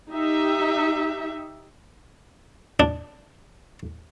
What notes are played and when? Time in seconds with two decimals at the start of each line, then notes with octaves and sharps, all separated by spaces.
0.11 D#4 G4 E5
2.80 D4